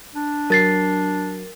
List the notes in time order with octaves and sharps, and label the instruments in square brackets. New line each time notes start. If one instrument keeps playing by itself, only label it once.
[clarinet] D4
[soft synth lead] F#3 [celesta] A#4 A6 C7